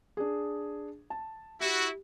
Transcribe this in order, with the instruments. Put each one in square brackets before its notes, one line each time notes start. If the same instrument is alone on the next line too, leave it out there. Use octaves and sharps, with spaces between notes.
[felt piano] D4 G#4
A5
[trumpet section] E4 F#4 [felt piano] G4